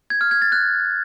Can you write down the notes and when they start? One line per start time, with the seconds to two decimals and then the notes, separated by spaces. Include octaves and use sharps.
0.10 G#6
0.21 F6
0.31 G#6
0.42 A6
0.52 F#6